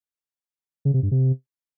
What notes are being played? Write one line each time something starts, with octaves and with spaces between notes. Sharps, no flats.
C#3
C3
G2
C3